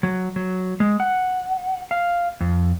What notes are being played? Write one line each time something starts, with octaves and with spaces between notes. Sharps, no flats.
F#3
F#3
G#3
F#5
F5
F2